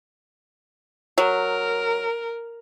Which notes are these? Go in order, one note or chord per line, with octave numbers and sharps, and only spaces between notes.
F#3 A#4